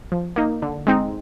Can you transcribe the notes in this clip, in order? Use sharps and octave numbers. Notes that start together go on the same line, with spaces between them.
F3
A#3 D#4
D3
G#3 C4 D#4